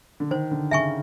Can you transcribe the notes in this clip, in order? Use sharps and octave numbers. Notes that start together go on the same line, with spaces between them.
D3
D#3 C5
D3
C#3 E5 G#5 C#6